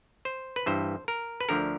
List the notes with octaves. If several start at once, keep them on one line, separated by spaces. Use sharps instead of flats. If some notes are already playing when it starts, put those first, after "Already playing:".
C5
B4
G2 E3 C5
A#4
B4
D2 D3 F3 A#4